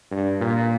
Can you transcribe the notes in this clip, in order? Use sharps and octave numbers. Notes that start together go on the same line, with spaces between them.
G2
A#2